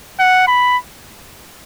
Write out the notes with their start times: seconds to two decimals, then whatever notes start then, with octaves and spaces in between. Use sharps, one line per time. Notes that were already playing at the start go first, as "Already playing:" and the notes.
0.20 F#5
0.47 B5